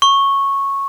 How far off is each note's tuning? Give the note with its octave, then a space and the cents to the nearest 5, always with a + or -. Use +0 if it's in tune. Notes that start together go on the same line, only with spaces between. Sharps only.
C#6 -10